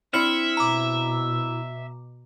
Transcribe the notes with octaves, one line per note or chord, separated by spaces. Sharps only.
C4 D4 E4 E5 F6 C#7 F#7
B2 A#5 D6